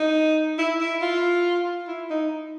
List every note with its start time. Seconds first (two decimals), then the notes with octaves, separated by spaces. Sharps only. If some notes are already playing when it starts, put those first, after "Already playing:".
Already playing: D#4
0.59 E4
0.81 E4
1.02 F4
1.88 E4
2.10 D#4